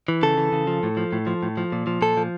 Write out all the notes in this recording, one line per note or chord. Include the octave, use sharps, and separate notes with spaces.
E3
C#3 A4
E3
C#3
F3
A2
F3
A2
F3
A2
F3
A#2
F3
A#2 A4
F3